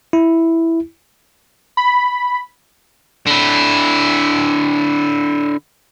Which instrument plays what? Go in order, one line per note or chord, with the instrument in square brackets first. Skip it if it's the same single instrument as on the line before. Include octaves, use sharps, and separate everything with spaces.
[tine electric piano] E4
[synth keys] B5
[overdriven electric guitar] D3 E4